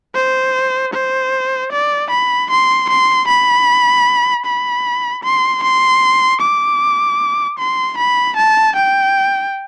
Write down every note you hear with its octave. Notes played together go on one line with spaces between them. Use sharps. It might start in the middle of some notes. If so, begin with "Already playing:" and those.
C5
C5
D5
B5
C6
C6
B5
B5
C6
C6
D6
C6
B5
A5
G5